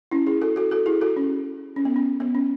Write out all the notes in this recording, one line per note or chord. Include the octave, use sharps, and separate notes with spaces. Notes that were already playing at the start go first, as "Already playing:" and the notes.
C#4 E4
E4 G#4
F#4 A4
F#4 A4
F#4 A4
E4 G#4
F#4 A4
C#4
C#4
B3
C#4
B3
C#4